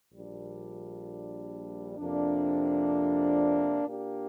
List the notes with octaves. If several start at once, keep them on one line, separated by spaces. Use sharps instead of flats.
A#1 A#2 G3 D4
F2 C3 A#3 D4
A#2 A#3 D4 G4